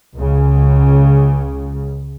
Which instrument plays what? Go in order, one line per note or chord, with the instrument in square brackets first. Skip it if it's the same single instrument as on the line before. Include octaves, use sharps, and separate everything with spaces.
[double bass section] C#2 C#3